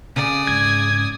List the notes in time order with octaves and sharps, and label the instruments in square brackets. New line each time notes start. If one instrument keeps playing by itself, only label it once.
[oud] C#3 [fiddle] D5 D#6
[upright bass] G#2 [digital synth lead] G#6